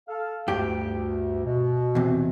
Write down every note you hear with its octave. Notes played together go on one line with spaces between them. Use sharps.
A4 F5
D2 G2 G4
B2
E2 C3